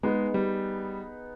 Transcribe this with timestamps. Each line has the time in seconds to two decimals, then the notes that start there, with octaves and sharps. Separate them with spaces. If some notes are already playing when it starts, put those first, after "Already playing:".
0.03 G#3 B3 D#4 G#4 B4
0.34 G3